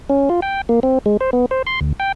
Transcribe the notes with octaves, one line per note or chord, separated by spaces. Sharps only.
C#4
F4
G5
A#3
C4
G#3
C5
B3
C5
C6
D2
G5